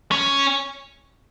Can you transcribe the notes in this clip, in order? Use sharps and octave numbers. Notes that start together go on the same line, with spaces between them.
C#4